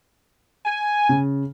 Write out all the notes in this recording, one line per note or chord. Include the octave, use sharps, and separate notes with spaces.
G#5
C#3